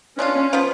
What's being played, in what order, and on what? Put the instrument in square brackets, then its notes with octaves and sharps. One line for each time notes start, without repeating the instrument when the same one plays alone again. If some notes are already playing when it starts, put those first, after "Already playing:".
[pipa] G#3 D4 F4 [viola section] C#4
[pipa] C#3 F3 B3